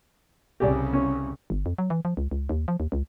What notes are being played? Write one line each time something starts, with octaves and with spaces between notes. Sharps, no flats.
C2 C#3 G4 G#4 D5
C#4
G1
F2
F#3
E3
F3
C#2
C#2
D#2
F3
D#2
C#2